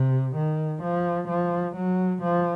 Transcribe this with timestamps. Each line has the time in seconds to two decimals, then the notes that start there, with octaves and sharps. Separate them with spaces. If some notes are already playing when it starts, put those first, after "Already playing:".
Already playing: C3
0.36 D#3
0.82 F3
1.28 F3
1.76 F#3
2.22 F3